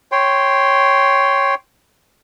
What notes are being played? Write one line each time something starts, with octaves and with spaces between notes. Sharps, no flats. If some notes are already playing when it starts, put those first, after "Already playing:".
C#5 G5 C6